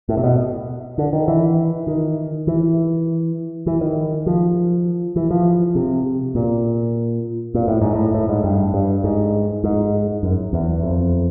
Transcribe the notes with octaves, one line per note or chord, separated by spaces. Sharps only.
A2
C3
B2
D3
D#3
E3
D#3
E3
E3
D#3
F3
E3
F3
C3
A#2
A#2
A2
G#2
A2
A2
G#2
G2
G2
G#2
G#2
F#2
E2
F2